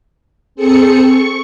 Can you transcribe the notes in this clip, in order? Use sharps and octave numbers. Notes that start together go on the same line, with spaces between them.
C4 G#4 A4 C#7
C#6